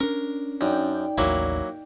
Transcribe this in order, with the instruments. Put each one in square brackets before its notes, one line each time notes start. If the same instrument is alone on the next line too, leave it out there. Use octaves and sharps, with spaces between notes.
[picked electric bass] C#4 D4 [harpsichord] A#4
[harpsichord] F#2 [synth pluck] D#4 D5 G5
[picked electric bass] A1 D#2 [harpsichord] F#3 A#3 E4